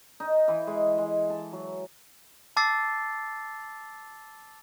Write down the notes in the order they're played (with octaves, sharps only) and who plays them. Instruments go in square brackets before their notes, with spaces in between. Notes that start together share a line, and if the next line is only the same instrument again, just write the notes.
[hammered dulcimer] D#4
E3
G#3
G#3
A5
F#3
[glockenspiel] A5 D6 E6 A6 C7